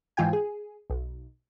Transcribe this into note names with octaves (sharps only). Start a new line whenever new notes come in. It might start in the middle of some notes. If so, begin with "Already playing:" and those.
G#2 E3 F4 G5 G#5
G#4
B1